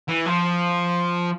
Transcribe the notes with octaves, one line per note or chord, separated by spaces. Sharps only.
E3
F3